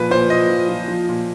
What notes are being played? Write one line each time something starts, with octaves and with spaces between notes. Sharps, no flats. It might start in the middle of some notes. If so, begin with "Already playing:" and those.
Already playing: A#2 F3 B4
A#2 C5
A#2 D#5
F3
F3
F3
A#2